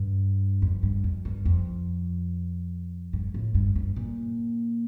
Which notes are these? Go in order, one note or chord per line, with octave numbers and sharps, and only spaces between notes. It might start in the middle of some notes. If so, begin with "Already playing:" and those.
Already playing: G2
F2
G2
F2
G2
F2
G2
A2
G2
G2
A#2